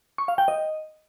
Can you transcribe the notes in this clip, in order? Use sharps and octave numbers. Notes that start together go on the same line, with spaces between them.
C#6
F5
G5
D#5